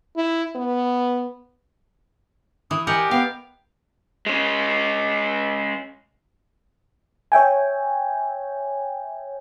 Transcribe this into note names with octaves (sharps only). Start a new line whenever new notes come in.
E4
B3
E3 D#6
G4 A#4 D#5 F#5 G#5
B3 F5 G5
G#3 C#4
C#5 E5 G5 G#5